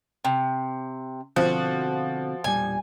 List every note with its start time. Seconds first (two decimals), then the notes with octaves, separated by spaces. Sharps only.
0.25 C3
1.36 B2 D3 F3 C4 F#4
2.44 E1 A#2 G3 G#5